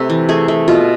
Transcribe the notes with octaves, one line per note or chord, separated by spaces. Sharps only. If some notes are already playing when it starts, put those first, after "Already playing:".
Already playing: C3 A3 A4 B4
E3
A3 G#4
A3
B2 F4